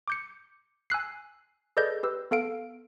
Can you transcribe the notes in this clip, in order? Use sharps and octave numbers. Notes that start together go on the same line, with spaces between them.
D6 G6 C#7
G#5 E6 F#6 C7
G#4 A4 B4 D5 D#5 G6
G4 B4 E6
B3 A4 F5 D7